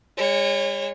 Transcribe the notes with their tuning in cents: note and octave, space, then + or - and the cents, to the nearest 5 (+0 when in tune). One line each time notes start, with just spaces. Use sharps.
G#3 -45 C#5 -10